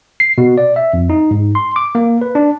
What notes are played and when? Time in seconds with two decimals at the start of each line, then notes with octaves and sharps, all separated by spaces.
0.20 C7
0.38 B2
0.58 D5
0.76 E5
0.93 F2
1.10 D#4
1.31 G#2
1.55 C6
1.76 D6
1.95 A#3
2.21 B4
2.35 D4